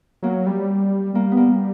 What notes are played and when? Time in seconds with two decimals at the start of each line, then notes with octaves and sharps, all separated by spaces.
0.23 F#3 A#3
0.46 G3
1.14 G3 A#3
1.32 B3
1.37 A#3